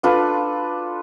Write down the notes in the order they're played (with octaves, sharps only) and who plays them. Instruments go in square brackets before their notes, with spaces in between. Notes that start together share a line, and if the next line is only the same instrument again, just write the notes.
[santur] D4 F4 A4 B4